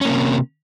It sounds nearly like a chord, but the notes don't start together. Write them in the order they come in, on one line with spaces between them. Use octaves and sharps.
C#4 A#3 C3